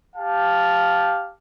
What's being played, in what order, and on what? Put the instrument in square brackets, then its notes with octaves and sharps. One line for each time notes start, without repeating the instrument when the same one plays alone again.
[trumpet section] G4 F5 A5